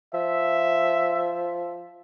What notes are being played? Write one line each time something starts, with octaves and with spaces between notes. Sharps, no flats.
F3 E5